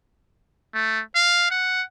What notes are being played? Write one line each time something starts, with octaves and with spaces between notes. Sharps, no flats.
A3
F5
F#5